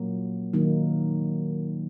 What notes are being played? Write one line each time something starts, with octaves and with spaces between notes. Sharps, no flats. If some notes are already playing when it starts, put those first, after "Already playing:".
Already playing: A#2 F#3 A#3
D#3 F#3 A#3 D#4